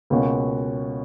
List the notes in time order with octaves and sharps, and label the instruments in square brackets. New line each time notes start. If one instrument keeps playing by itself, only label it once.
[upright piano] C#2 B2 A#3 C#4 F#4